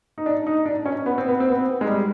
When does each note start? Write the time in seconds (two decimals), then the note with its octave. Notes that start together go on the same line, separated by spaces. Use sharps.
0.18 D#4
0.26 D4
0.47 D#4
0.66 D4
0.86 C#4
1.06 B3
1.18 C4
1.28 B3
1.40 C4
1.51 B3
1.81 G#3
1.86 G3